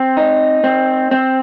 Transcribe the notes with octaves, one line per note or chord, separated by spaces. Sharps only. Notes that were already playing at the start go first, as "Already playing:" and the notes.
Already playing: C4
D#4
C4
C4